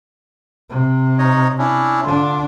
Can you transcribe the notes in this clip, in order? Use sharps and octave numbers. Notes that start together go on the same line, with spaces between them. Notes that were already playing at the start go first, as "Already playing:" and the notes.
C3
D#4 C#5 D#5
C#4 D4 E4
D3 D4 F4